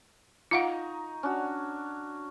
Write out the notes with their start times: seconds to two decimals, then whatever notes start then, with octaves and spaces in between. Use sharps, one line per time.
0.51 D#4 F4 F5 F#5 A#5 C#6
1.23 C#4 D4 F#4